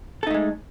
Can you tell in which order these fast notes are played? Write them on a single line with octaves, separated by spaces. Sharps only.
A4 D#4 A3 G#3